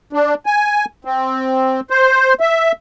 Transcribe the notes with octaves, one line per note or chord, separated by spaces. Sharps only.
D4
G#5
C4
C5
E5